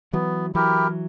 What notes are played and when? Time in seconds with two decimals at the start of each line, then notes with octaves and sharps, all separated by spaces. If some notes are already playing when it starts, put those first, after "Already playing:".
0.13 E3 F#3 B3
0.54 E3 F#3 E4 G4 A#4